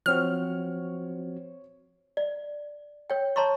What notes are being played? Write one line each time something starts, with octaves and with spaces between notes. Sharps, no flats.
F3 C4 F#4 C5 C#5 F6
D5
C#5 G5
C#5 A5 A#5 C6 C#6